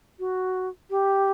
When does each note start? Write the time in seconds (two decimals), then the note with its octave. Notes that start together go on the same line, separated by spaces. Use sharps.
0.19 F#4
0.90 G4